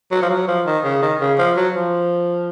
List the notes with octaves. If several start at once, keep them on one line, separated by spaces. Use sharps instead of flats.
F#3
F3
F#3
F3
D#3
C#3
D#3
C#3
F3
F#3
F3